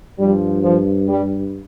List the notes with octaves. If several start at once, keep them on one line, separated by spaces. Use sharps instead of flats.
G2 F3 G3
F3
G3